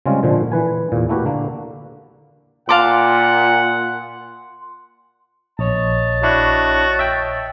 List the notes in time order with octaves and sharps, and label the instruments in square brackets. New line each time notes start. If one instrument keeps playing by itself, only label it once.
[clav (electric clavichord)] C#3 G3 G#3 C4 C#4 F4
A#2 D3 F3
E3 B4 G#5
E2 A#2
A3 A#3 E4 F#4 G4 B4
D3 A#3
[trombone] A#2 [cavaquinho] F5 A5 D6 [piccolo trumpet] F#5 [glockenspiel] C6
[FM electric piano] A#1 [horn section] C#5 D#5 A5
[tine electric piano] D4 E4 [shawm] F#4
[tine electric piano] E5 G5